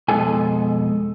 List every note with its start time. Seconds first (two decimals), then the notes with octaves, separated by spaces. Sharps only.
0.09 F2 B2 G#3 A4 G#5